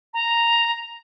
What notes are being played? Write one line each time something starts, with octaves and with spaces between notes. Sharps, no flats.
A#5